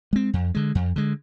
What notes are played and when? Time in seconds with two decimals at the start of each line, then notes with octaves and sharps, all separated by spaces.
0.13 G#3 C4
0.33 F2
0.55 D3 G#3
0.75 F2
0.96 D3 G#3